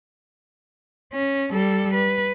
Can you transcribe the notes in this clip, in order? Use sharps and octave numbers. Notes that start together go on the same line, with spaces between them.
C#4
G3 A4
B4